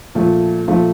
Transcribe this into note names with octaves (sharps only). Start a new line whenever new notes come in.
A#2 F3 A3
A#2 F3 A3